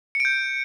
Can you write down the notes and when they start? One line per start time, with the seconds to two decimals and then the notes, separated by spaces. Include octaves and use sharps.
0.15 C#7
0.20 D7
0.25 G6